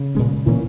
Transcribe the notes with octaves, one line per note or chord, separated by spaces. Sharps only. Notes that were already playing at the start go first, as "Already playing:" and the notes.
Already playing: C#3
A#2 G#3 C#4
A#2 E3 A#3 C#4